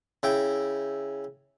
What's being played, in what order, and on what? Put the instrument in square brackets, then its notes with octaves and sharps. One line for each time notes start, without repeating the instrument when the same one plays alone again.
[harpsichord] C#3 E4 G5